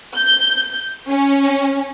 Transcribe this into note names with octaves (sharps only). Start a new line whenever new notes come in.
G6
C#4